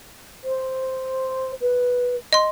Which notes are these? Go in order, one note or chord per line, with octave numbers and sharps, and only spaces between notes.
C5
B4
D#5 C6